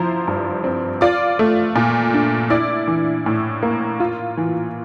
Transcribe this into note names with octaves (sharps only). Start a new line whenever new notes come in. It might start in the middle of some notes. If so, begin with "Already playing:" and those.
Already playing: F3 E4 C5 A#5 C6
G2
C4
F4 D5 D6
A3
A#2
D4
E4 D5 D6
E3
A2
A#3
F4
E3